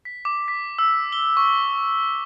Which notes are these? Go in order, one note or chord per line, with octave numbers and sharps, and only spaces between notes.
B6
D6
B6
E6
G7
C#6